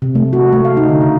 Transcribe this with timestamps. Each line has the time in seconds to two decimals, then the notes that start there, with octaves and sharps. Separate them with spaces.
0.02 C3
0.15 A3
0.33 F#4
0.53 A3
0.65 F5
0.77 D#4
0.88 D3
1.01 C#3